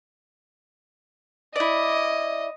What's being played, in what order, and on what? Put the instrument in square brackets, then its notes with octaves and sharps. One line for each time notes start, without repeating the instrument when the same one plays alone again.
[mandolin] E4 D5 [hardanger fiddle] D#5